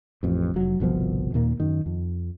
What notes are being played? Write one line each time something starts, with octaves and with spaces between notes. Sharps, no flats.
A1 F2
F1 F#3
G1 C2 B2 F3
D#2 A#2 A#3
F#2 D#3
F2